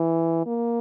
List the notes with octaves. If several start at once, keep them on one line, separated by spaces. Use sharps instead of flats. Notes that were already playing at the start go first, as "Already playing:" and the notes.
Already playing: E3
A#3